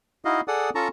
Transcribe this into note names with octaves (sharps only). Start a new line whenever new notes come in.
D#4 E4 F#4 D#5 F5
G#4 A4 D5 F#5 D#6
C#4 F4 A4 A5 A#5 C#6